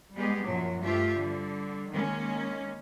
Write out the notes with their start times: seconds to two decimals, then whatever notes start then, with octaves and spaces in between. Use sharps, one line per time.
0.15 G3 G#3 B3 G4 G#4
0.45 F#2 A#2 F3 F#3
0.82 G2 A3 F4 G4 C5 E5
1.16 D3 G3
1.89 D#3 G#3 A#3 C#4